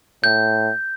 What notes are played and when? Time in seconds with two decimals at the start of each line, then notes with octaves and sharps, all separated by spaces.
0.23 A2 G6